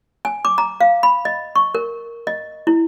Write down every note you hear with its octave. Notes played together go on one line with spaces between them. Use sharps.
G#5
D6
A#5
F5
B5
D#5
C#6
A#4
D#5
E4